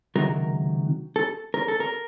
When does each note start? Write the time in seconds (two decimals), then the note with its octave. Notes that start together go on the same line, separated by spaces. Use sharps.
0.16 C#2 C3 D#3 F#3 A#4
1.16 A4
1.54 A#4
1.68 A4
1.80 A#4